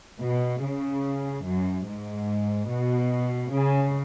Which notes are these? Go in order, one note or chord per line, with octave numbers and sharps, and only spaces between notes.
B2
C#3
F#2
G#2
B2
C#3